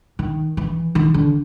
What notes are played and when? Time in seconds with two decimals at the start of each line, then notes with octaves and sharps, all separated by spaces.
0.19 D#3
0.57 E3
0.95 D#3
1.14 D3